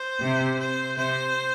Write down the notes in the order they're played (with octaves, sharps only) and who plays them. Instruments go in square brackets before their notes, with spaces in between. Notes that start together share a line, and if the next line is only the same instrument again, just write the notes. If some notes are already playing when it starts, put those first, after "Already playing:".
Already playing: [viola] C5
[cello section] C3
[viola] C5
[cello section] C3 [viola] C5